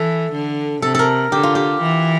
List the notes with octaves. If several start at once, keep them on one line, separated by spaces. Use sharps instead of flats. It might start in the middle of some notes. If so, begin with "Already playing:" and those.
Already playing: E3 A4
D3
C3 A4
A4 A#4
D3 G4
F4
G4
E3